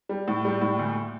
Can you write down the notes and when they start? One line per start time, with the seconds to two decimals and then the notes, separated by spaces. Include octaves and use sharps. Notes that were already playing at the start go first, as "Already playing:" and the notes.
0.09 G3
0.28 A2
0.45 G3
0.62 A2
0.79 D2